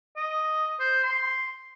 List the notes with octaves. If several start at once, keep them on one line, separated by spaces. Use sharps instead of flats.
D#5
C5
C6